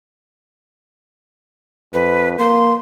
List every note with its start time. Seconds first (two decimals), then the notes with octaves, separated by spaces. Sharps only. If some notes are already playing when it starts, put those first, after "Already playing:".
1.94 F2 B4
2.39 A#3 C6